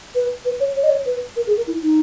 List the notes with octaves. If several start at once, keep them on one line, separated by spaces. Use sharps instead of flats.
B4
B4
C#5
C#5
D#5
C#5
B4
A#4
G#4
A#4
E4
D#4